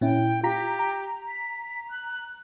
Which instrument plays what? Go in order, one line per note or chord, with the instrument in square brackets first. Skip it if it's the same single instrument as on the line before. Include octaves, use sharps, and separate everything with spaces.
[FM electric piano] A#2 C#4 E4 [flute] G5
[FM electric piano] F4 A#5 B6 [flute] G4
[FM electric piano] A#5
[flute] B6
F#6